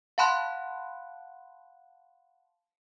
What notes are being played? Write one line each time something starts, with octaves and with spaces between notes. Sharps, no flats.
F5 F#5 A5 B5 C6 F#6